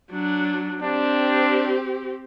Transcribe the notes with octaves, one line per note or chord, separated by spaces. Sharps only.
F#3 D4
C4 D4 G4